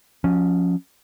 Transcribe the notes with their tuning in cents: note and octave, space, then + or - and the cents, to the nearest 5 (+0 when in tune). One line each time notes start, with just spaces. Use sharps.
F3 +25 C#4 +0